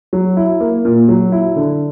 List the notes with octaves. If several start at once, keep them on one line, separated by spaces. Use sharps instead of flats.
F#3
E4
A#3
A#2
F#3
E4
D3